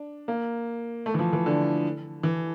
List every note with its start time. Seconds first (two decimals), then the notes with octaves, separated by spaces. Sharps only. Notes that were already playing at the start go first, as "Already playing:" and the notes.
Already playing: D4
0.28 A#3
1.06 A3
1.14 E3
1.19 F3
1.33 E3
1.46 D3
2.23 E3